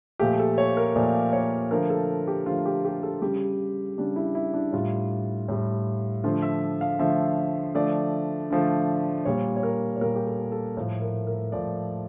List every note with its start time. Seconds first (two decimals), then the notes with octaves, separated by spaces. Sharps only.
0.19 A#2 F3 A3 G4
0.39 A4
0.58 C#5
0.77 A#4
0.95 A#2 F3 A3 D5
1.33 C#5
1.71 D3 F3 A3 A#4
1.90 A4
2.28 G4
2.46 D3 F3 A3 F4
2.66 G4
2.85 G4
3.03 A4
3.22 C#3 G3 G4
3.97 C#3 G3 D4
4.16 E4
4.35 E4
4.54 D4
4.73 A2 G3 F4
5.48 A2 G3
6.24 D3 F3 A3 F4
6.42 E5
6.81 F5
6.99 D3 F3 A3 E5
7.74 D3 F3 A3 D5
8.51 D3 F3 A3
9.25 A#2 G3 C#5
9.57 C#5
9.63 A#4
9.97 C#5
10.01 A#2 G3 A#4
10.15 G4
10.27 A4
10.52 A4
10.77 A2 F3 A3
11.01 A#4
11.27 A#4
11.52 A2 F3 A3 D5